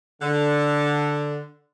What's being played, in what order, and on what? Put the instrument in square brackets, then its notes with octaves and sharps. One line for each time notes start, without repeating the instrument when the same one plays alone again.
[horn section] D3